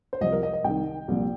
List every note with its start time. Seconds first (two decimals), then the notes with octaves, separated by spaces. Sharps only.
0.13 C5
0.21 C2 C3 F3 D#5
0.32 A#4
0.43 D#5
0.53 D#5
0.64 C2 C3 D#3 G5
1.08 C2 A#2 F3